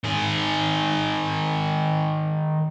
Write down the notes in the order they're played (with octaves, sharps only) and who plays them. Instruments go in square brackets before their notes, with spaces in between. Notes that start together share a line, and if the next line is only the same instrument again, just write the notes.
[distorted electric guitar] D#3 G#4